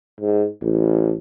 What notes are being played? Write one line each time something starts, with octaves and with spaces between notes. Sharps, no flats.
G#2
A1